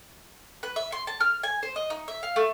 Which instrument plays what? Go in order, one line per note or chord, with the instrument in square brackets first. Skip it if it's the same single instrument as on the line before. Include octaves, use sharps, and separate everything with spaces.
[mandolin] B4
E5
C6
A5
F6
G#5
C5
D#5
D#4
E5
F5
A3